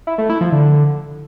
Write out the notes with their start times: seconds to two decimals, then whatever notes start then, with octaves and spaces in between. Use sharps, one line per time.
0.07 E4
0.18 A3
0.30 E4
0.41 F3
0.52 D3